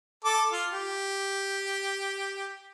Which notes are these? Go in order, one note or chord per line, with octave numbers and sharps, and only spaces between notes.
A4 D6
F4
G4